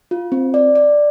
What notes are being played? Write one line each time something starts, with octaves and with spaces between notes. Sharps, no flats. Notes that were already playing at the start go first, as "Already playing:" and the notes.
F4
C4
D5
D5